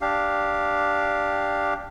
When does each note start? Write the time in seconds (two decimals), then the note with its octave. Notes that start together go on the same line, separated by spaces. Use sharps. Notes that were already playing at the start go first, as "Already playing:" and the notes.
0.01 D4 G4 F5